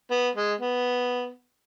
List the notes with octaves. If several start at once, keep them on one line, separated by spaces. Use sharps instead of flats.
B3
G#3
B3